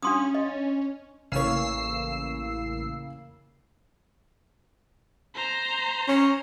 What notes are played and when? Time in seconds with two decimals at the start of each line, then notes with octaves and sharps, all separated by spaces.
0.03 C#4 D4 C6 D#6
0.35 D#5
1.32 A1 C#3 E3 A#3 C#4 C#5 E6 C7
5.35 C5 A#5
6.08 C#4